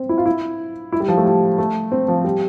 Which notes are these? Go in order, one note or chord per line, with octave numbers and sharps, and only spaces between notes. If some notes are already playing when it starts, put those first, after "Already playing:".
Already playing: C4
E4
F4
E4
E4
G3
F3
A3
G3
A3
C4
F3
G3